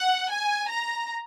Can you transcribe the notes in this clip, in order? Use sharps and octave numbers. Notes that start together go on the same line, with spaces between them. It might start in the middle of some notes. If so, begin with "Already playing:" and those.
Already playing: F#5
G#5
A#5